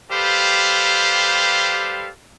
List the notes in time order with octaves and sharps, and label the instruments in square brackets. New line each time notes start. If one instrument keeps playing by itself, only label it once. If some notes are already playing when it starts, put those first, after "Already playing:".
[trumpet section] G3 G4 A4 B4 C5 F5